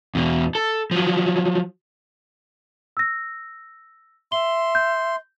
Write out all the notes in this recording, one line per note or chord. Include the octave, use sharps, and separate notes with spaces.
E2 B2
A4
F3 F#3
E6 A#6
E5 C6 G7
G6